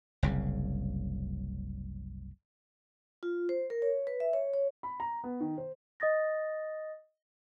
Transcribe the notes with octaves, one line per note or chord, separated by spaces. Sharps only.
F#1 C2 C#3
F4
C5
A#4
C#5
B4
E5
C#5
C#5
B5
A#5
B3
D#3
C5
D#5 D#6 A6 A#6